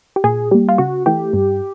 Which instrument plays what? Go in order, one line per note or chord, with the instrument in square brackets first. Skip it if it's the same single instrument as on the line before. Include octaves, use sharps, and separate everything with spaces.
[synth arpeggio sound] G4
A#2 G#4
G3 A#3 G4
F4
C#3 F#4
E3 A3 G4
G2